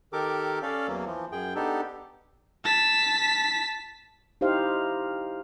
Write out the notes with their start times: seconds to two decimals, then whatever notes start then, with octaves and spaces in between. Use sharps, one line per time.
0.13 D#3 G4 A4 A#4 D6
0.63 C#4 A4 D5 F5
0.88 E2 E3 F#3 A#3
1.06 E3 F3
1.32 F#2 G#4 G5
1.55 B3 D4 D#4 G4 A4
2.65 A5 B6
4.41 D#4 E4 G4 C5 F5